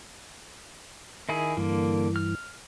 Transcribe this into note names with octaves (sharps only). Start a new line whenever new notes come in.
D#3 E4 G#4
G2 D3 E3 A#3
F6